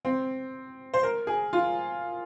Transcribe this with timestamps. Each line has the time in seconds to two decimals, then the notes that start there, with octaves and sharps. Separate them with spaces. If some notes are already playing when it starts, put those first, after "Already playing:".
0.05 C4
0.94 C5
1.03 A#4
1.27 G#4
1.53 F4